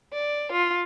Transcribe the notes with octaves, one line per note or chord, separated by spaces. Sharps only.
D5
F4